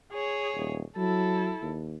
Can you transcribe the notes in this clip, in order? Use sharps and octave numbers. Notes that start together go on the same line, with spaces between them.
G#4 C#5
D#1
F#3 E4 A4
D#2